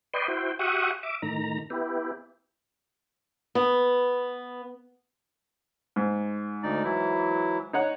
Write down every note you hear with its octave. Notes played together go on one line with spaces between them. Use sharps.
B4 D5 D#5 G5 C6
E4 F#4 C5 G5
F#4 G4 E5 F#5 C#6 D#6
E5 D6
A2 D#3 A#5
B3 E4 G4
B3
G#2
D2 D#4 D5
E3 F#3 E4
D#4 C#5 F#5